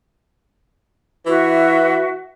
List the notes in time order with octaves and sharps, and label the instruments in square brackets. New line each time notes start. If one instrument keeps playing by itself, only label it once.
[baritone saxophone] E3 [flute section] F#4 E5